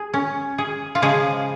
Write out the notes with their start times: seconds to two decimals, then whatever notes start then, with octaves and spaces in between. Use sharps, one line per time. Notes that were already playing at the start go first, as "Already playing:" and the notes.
Already playing: G#4
0.13 C#4
0.58 G#4
0.95 F4
1.02 C#3 F3 G#3 G#4